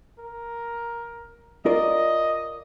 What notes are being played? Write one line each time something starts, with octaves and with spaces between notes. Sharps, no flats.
A#4
F4 A#4 D5 D#5